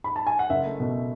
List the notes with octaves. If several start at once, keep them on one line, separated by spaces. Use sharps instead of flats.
B5
A5
G#5
F#5
F#1 E5
A3
B2